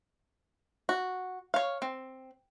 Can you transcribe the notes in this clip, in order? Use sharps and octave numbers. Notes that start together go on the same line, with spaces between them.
F#4
C#5 F5
C4